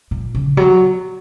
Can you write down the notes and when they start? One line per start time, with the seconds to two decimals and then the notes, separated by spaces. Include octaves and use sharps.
0.11 A#2
0.35 C#3
0.57 F#3